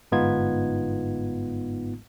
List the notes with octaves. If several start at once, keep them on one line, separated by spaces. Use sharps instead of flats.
G1 G#2 B3 D#4 F4 G#6